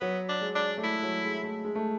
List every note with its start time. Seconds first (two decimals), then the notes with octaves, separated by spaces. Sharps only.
0.01 F#3 B3
0.29 D4
0.41 G#3
0.55 D4
0.78 A3
0.83 G#3 E4
1.03 F#3
1.24 G#3
1.44 A3
1.65 G#3
1.75 A3